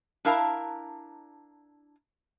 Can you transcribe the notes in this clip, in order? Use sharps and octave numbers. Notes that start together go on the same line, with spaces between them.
D4 E4 A#4 F5 A5 A#5